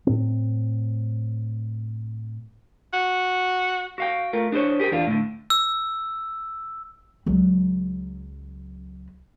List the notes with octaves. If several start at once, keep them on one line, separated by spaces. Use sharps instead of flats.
A2 C4
F#4
F#4 F5 G5
A3 F4 A#4
D4 G#4 A4 C5 C#5
G4 G#4 A#4 C5 G5
E2 D4 F4
A2 D3
E6
C#2 F#3